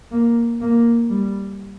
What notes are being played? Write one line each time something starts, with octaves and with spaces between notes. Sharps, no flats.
A#3
A#3
G3